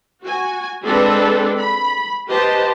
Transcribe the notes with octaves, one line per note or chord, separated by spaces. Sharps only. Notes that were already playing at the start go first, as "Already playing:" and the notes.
F#4 G#5
G#3 C4 D4 A4 B4
B5
G4 B4 C5 D#5 A5